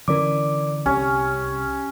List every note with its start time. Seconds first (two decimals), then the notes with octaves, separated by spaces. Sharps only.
0.08 D3 E3 C#4 A#4 D5 D6
0.86 C2 C#4 G4